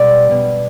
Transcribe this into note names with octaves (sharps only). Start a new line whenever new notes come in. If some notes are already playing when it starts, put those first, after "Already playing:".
Already playing: B2 G3 D5
B2 G3